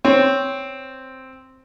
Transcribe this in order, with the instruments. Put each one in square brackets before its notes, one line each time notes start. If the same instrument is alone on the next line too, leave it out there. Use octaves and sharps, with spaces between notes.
[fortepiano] C4 [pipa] C#5